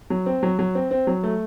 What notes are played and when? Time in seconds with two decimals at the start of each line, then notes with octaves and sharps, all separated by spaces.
0.10 F#3
0.26 C4
0.43 F#3
0.59 F#3
0.75 C4
0.91 C4
1.07 F#3
1.23 A3